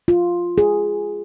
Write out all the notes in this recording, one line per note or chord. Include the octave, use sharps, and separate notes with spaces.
F4
G#4